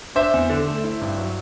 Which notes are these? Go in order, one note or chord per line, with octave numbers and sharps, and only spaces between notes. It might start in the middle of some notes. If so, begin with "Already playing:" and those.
D4 C5 E5
E2
D3
A3
E4
G2
F#3